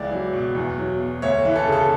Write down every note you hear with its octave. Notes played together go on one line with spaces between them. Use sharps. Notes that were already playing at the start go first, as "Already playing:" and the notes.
Already playing: C#2 E3 D5
F#3
B2
E2
F#3
B2
D2 C#5
E3
A4
C#3
A4